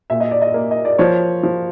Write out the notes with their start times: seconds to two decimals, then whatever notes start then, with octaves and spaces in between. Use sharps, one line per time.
0.10 A#2 E5
0.20 D#5
0.31 D5
0.42 D#5
0.54 A#3
0.71 D#5
0.85 D5
0.99 F3 C#5
1.43 F3